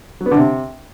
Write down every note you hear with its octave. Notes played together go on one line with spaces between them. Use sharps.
F#3
B3
D3
C3